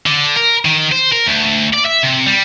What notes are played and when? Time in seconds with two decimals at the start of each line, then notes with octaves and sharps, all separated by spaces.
0.06 D3
0.37 A#4
0.65 D#3
0.91 C5
1.12 A#4
1.26 D2
1.74 D5
1.86 E5
2.04 C3
2.26 G3